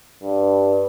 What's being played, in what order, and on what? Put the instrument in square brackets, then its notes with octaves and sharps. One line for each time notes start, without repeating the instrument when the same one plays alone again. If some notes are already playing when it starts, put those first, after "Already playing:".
[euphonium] G2